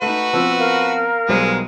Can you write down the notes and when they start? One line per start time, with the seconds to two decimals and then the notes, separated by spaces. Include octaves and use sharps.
0.02 A3 D#4 F#4 B4
0.33 F3 B3 C4 E6
0.59 A#4 F5
1.29 B1 G3 G#3 C5